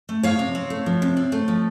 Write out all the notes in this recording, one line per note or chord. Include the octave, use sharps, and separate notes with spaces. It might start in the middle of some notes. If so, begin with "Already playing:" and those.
A3
F3 C#5 F5
C3
C4
A3
F3
C3
C4
A3
F3